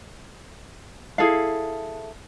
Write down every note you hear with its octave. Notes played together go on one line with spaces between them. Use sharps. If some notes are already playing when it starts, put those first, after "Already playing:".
E4 G#4 A4 F5